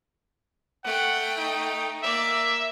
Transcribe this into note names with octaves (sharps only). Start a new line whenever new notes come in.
A3 F#5 G5
D#4
A#3 D5 E5